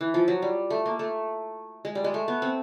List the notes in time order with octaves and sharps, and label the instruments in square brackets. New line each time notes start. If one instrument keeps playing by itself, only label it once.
[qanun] E3
F3
F#3
G3
A3
A#3
A3
G#3
G3
G#3
A3
B3
C4